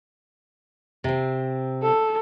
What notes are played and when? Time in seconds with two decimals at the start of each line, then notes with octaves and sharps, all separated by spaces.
1.04 C3 C4
1.83 A4